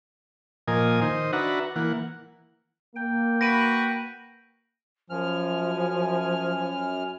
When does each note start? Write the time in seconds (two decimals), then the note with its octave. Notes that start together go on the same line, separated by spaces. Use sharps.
0.68 A#2 F3 A#4 D#5 G#5
1.01 D#3 C5 D#5
1.33 D4 F#4 B4 E5 F#5 A#5
1.76 E3 A#3 F#5
2.96 A#3 G5
3.41 F#4 B4 A#6 D7 D#7
5.10 F#2 F3 G#5 F6